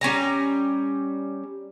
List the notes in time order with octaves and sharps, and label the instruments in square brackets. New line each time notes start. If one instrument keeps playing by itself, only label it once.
[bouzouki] G3 C#4 G#5 A#5